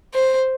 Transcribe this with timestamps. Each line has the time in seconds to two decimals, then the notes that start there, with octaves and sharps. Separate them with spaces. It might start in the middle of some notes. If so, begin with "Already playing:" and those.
0.14 C5